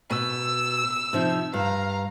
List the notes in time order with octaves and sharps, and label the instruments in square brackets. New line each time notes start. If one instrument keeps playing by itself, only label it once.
[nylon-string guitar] B2 [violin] E6
[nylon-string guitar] C3 F3 D#4
[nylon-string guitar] G2 [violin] F5 A#5